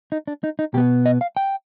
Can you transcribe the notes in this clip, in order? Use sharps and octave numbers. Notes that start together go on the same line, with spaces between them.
D#4
D4
D#4
D#4
B2 B3 G4
D#5
F5
G5